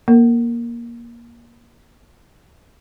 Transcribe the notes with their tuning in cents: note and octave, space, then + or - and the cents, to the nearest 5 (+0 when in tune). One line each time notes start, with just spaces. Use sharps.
A#3 +20 A#4 -25